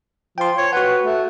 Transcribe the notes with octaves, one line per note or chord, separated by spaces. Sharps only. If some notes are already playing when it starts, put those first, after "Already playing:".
F3 G5 C6
C#5
F#4 B4 F#5
A3